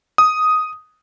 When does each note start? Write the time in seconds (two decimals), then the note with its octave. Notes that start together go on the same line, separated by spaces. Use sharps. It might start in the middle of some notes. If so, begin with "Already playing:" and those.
0.18 D#6